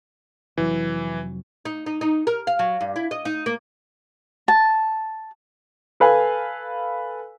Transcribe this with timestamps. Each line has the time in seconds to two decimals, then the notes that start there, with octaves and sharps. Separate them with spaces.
0.57 F1 E3 F#3
1.65 D#4
1.86 D#4
2.01 D#4
2.27 A#4
2.47 F5
2.59 F#3
2.81 G2
2.96 E4
3.11 D#5
3.25 D#4
3.46 A#3
4.48 A5
6.00 A4 B4 F5 G#5